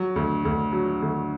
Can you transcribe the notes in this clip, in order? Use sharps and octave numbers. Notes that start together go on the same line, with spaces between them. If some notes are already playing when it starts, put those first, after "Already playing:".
Already playing: F#3
D2
D2
F#3
D2